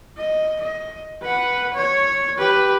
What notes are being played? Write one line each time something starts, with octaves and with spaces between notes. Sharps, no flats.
D#5
D#5
B4 F#5
C#5
G4 B4